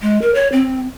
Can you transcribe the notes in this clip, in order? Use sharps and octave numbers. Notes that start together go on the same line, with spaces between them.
G#3
A#4
C#5
C4